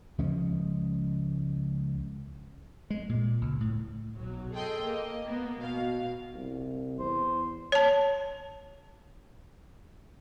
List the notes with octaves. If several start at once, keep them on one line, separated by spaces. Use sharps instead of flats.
C#2 F3 G#3 C#4
G#3
A#2
C#2
A2
B1 F#3
G#4 A4 D#5 G5 C6
A#3 D#5
A#3 B3
B2 F5
C2
E2 C5
C#5 A5